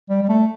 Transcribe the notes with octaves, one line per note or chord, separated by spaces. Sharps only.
G3
G3
A3